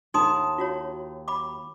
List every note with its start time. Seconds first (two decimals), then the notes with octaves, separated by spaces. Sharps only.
0.14 D#2 D#4 A5 C6 D#6
0.58 F4 F#4 C#5
1.28 B5 D6